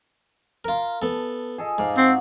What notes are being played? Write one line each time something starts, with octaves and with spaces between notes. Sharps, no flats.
F4 A#4
B3 A4 A5
G#4 A4 D#5
G#2 F5 D6
C4 F#4